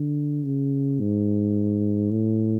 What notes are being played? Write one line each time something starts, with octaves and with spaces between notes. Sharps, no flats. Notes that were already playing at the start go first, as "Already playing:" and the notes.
Already playing: D3
C#3
G#2
A2